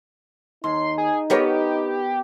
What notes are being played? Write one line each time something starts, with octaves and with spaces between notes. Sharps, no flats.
D#2 D#4 C6
G#4
B3 G4 A#4 C#5